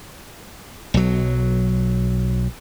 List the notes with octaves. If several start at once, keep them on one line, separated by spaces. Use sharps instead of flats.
B1 F#3